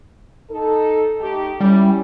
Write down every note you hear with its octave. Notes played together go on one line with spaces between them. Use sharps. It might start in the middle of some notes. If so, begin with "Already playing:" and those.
D#4 A4
A3 D#4 G4
G3 C#4 E4